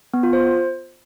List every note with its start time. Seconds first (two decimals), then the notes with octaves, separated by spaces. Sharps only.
0.14 B3
0.23 F4
0.33 C5